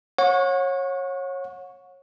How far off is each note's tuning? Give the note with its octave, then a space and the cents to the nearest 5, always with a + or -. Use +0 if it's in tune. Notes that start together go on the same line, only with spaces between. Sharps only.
C#5 -25 F#5 -35 C#6 +0